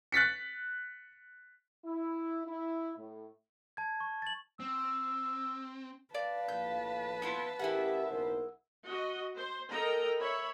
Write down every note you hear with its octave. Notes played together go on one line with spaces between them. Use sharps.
F#6 A6 B6 C#7
E4
E4
A2
A5 G#6
C#6
A6 F#7
C4 E6
B4 D5 F5 A5
A#1 A2 G6
B3 E4 F4
A1 E4 G4 G#4 A#4 E5 F#5
F#1 B1 A#4 C5
F#4 D#5
C5
A4 A#4 D#5 G5 A#5
C#5 E5 B5